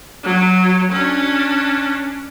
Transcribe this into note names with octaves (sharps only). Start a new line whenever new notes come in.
F#3
C#4 D4